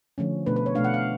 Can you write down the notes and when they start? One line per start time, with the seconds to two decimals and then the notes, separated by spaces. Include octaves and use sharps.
0.18 D3 F3 A3 C#4
0.46 B2 A3 D4 B4
0.56 B4
0.66 C#5
0.75 B2 A3 D4 F5
0.84 F#5
0.94 F5